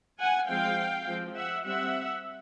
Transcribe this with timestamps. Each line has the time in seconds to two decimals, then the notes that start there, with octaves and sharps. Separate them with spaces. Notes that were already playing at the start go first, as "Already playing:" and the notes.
0.20 F#5 G#5
0.48 F3 G#3 C4 F5 G5
1.06 F3 G#3 C4
1.36 E5 F#5
1.64 G3 C4 E5 F#5